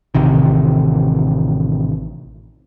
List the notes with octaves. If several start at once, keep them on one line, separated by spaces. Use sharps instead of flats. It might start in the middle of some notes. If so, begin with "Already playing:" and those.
A1 C3 D#3